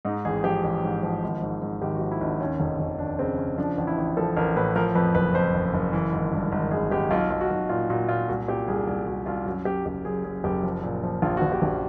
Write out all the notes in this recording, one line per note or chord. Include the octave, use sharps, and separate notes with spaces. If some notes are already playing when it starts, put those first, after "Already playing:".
G#2 D#4
A1 G#4
F3 G4
A1
G#2
F3
G#1
G#2
G#2
G#1 G4
F#4
F3
E4
G#1 D4
D#2 C#4
F1
F1
D#2 D4
C#3 C4
C#3 C#4
F3 D4
A1
E4
A1
F3 A4
A1 A#4
A2 B4
F3 A#4
F2 B4
F#1 B4
F2 C5
F#1
F#1
E3
G#1
G2
G#1
G#1 G#4
G#1 G4
B1 F4
B1
F#4
B1
A#2 F4
A#2 F#4
A#2 F4
C2 F#4
A#2 G4
C2 G#4
C2
C2 F#4
C2 F4
F#2 F#4
F#2 G4
F#1 G4
F#2 G#4
F#2 G#4
F#1 G4
F3
A#2
F3
A#1 F4
F#4
A#1
G4
A#1